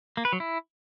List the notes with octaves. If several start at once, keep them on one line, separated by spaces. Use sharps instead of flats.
A#3
B4
F#3
E4